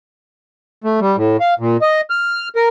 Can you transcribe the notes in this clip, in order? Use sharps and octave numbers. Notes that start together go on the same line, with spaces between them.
A3
G3
A2
F5
A#2
D#5
F6
A#4